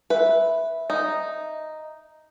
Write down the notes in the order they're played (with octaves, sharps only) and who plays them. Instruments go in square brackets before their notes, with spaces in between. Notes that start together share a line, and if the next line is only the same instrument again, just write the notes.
[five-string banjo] B4 [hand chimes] E5
[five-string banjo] D#4